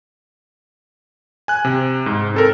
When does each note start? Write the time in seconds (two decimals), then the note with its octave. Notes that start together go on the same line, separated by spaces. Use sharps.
1.48 G#5 F#6
1.65 C3
2.06 G#2
2.34 C4 A4 A#4